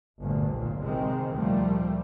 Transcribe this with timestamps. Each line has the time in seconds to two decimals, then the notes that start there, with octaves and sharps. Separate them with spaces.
0.19 G1 D2 A#2
0.53 B1 A#2
0.81 C3 D#3 G#3 C4
1.33 D2 A#2 F3 G3 A3